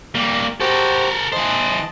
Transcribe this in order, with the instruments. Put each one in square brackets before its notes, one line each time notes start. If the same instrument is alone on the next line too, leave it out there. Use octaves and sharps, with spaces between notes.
[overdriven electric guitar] G3 A#3
[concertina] F#4 G4 C5 [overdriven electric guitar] A4 A#4
[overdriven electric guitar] E3 C5 [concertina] D#5 A5